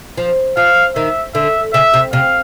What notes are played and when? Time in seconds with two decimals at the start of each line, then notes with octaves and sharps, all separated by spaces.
0.18 F3
0.57 F3 F5
0.95 D#3 E5
1.35 D3 E5
1.73 C#3 E5
1.94 C3
2.13 C3 F5